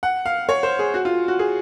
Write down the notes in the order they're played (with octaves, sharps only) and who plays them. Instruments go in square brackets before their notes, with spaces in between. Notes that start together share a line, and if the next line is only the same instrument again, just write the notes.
[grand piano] F#5
F5
C#5
C5
G#4
F#4
F4
F#4
G#4